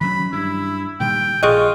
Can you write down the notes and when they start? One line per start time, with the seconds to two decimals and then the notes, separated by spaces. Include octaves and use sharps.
0.01 D#3 F#3 C#4 B5
0.33 G2 E4
1.00 A#2 D#3 G3 G5
1.43 A#1 F4 G#4 D#5 C#6 F#6